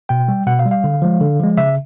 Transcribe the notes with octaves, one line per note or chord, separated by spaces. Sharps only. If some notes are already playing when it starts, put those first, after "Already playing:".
B2 G5
G3
B2 F#5
F5
G3
F5
D3
F3 G#3
D3
F3 G#3
C#3 E5